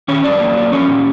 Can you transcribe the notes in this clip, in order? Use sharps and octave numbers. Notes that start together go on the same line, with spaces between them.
D#3 C#4 C#5
F#2 D4 D5
A#3
F#3
F3 C#4 C#5
A#2